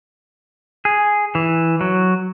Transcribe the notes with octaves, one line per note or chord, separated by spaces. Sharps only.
G#4
E3
F#3